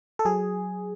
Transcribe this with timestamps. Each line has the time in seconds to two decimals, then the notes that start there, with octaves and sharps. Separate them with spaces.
0.19 A4
0.25 F#3 G#4